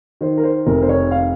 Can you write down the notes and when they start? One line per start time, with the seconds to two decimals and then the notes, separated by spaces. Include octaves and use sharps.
0.21 D#3 C5
0.38 A#4
0.43 C5
0.66 F1 A#4
0.82 C5
0.89 C#5
1.11 F5